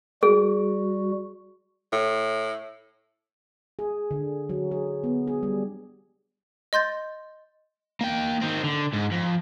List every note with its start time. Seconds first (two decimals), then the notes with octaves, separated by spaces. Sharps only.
0.23 G3 F#4 G#4
1.92 A2
3.79 G#4
4.11 D3
4.49 F#3
4.71 G#4
5.04 B3
5.27 G#4
5.43 G3
6.73 D#5 C6 G6 A6
8.01 A#3 G5
8.41 D#3 C4
8.64 D3
8.94 G#2
9.12 F2